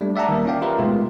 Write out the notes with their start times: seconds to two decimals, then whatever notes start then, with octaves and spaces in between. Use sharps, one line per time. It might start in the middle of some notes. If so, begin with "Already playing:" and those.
0.01 G3 A3 D4
0.16 D5 E5 F#5 A5 A#5
0.29 D#3 G3 A#3 A#4
0.45 C#4 D#4 F4 D5 F5 G5
0.61 D#4 F4 G4 A#4 B4 E5
0.78 B2 G#3 A3 F4